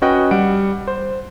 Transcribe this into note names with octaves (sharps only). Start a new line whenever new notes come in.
C#4 F#4 B4 D#5 G5 F#6
G3 F#5 D7
C5